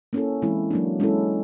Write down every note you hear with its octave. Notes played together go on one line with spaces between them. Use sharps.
A#3 C#4 E4 A4
E3 G#3 C4 E4
F#3 A#3 D4
G#3 C#4 E4 A4